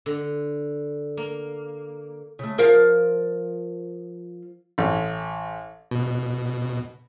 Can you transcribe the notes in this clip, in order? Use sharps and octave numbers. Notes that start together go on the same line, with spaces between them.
D3
A#3
C#3 A3
F3 A#4 F5
A1
B2